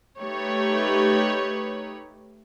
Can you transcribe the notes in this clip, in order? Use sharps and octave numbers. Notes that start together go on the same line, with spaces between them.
A3 D#4 G4 B4 C#5